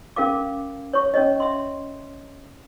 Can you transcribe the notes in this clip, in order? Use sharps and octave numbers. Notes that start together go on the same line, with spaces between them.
C#4 A#4 F5 D6
C#5 C#6
C#4 C#5 D#5
E5 C6